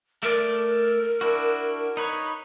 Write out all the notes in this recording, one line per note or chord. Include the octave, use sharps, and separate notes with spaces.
A3 A#4 D5
D4 E4 F#4
D#4 B4 C#5